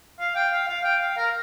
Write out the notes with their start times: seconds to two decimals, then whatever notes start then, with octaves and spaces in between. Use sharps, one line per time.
0.20 F5
0.35 G5
0.52 F5
0.68 F5
0.84 G5
1.01 F5
1.17 A#4